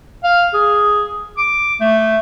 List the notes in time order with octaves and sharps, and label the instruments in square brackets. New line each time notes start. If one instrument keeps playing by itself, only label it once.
[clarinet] F5
G#4
D6
A3